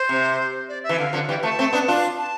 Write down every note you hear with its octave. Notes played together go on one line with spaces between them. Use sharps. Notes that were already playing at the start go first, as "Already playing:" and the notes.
Already playing: C5
C3
D5
E5
E3
D3 F5
D3 F3
E3 G3 G5
F3 A3 A5
A3 C4
B3 D4
D4 F4
A5